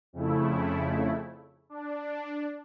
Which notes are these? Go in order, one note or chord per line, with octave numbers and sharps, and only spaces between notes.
F2 C#3 A3 E4
D4